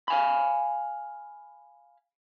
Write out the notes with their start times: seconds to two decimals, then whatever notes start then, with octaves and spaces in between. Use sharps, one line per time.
0.08 F5 G#5 B5